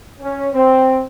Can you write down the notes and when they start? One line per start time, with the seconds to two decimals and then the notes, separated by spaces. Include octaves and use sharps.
0.20 C#4
0.53 C4